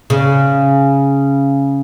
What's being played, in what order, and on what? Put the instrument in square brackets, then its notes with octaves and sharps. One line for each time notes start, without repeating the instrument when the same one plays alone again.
[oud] C#3